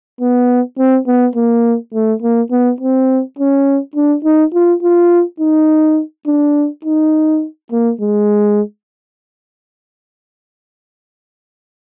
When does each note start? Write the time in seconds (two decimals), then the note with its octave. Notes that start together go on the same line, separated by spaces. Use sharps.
0.21 B3
0.78 C4
1.07 B3
1.36 A#3
1.93 A3
2.22 A#3
2.51 B3
2.81 C4
3.39 C#4
3.96 D4
4.24 D#4
4.54 F4
4.83 F4
5.40 D#4
6.27 D4
6.85 D#4
7.72 A#3
8.01 G#3